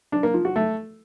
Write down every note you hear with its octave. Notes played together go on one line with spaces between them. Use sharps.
D4
A#3
F3
F#4
A3